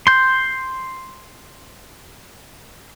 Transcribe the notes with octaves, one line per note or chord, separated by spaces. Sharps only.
C6 G6